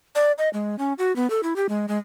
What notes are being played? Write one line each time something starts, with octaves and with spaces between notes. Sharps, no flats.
D5
D#5
G#3
C#4
F#4
B3
A4
E4
G4
G#3
G#3